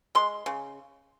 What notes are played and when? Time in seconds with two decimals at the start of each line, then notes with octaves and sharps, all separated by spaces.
0.15 G#3 C6
0.46 C#3